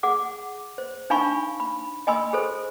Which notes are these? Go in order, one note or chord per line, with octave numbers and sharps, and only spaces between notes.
G#4 F#5 D6
C5
D4 D#4 F5 G#5 B5 C#6
B5
D#5 G#5 B5 C6 E6
G#4 A4 C5